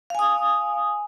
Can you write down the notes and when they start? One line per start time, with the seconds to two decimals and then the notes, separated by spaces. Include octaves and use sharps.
0.10 F5
0.15 G#5
0.19 D#6